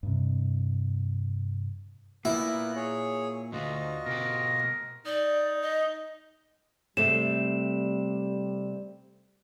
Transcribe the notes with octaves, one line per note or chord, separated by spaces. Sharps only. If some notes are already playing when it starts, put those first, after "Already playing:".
G2 C3
A#2 B3 E4 A#4 F#6
G#4 C#5
D2 A3 F4 F#4 D#5
B2 G4 A#4
D#4 D5
D#5
C3 G3 A3 E7